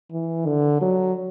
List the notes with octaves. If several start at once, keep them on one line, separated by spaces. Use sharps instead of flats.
E3
D3
F#3